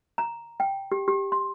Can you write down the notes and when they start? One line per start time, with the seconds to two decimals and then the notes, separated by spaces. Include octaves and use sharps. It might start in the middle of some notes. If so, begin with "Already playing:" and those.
0.18 A#5
0.60 G5
0.92 G4
1.08 G4
1.32 C6